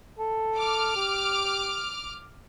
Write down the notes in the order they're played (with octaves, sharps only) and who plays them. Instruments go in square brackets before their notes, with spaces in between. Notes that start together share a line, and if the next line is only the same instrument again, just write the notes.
[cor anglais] A4
[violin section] D6 F6
[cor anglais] G4